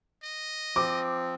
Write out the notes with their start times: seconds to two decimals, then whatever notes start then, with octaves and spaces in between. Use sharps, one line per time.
0.23 D#5
0.76 F3 C4 D6